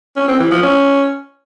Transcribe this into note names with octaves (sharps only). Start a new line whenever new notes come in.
C#4
C4
E3
F3
C#4